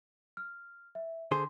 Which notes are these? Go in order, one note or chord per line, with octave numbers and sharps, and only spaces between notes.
F6
E5
D3 G#4 C5 C6